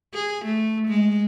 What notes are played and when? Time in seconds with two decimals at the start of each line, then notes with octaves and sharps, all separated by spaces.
0.15 G#4
0.46 A3
0.88 G#3